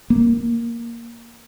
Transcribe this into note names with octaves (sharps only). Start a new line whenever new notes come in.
A#3